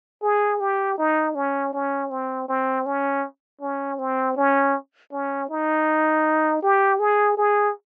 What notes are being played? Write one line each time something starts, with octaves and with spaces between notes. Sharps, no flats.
G#4
G4
D#4
C#4
C#4
C4
C4
C#4
C#4
C4
C#4
C#4
D#4
G4
G#4
G#4